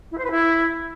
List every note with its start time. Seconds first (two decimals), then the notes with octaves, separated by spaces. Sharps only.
0.11 E4
0.17 C5
0.24 B4
0.30 E4